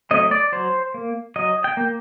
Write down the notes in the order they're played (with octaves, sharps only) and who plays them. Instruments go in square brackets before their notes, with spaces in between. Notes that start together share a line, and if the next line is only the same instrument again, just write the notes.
[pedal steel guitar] F#3 A3 C4 D#5
D5
F#3 C5
A#3
F#3 D#5
G5
A#3